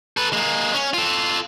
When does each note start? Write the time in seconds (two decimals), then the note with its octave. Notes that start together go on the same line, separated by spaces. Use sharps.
0.17 A4 B4
0.33 G#3 A#3
0.74 C#4
0.94 F4 A4